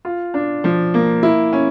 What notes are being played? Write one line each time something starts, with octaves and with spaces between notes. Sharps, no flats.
F4
D4
F3
A#3
E4
C#4